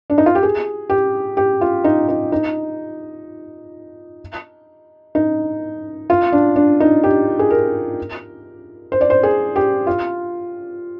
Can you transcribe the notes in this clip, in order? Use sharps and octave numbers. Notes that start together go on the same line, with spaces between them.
D4
D#4
F4
G4
G#4
G4
G4
F4
D#4
D#4
D#4
D#4
F4
D4
D4
D#4
G4
G#4
A#4
C5
D5
C5
G#4
G4
F4